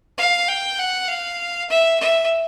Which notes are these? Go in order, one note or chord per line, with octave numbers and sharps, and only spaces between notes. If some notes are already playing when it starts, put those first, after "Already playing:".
F5
G5
F#5
F5
E5
E5